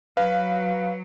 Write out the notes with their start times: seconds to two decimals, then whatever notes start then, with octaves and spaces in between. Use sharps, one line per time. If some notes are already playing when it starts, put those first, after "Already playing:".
0.17 F#3 B4 F5